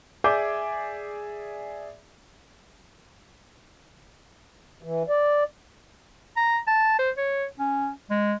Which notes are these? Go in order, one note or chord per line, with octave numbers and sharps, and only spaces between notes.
G#4 D5 E5 D6 G6
E3
D5
A#5
A5
C5
C#5
C#4
G#3